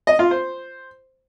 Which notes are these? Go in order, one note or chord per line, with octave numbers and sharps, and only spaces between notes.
D#5
F4
C5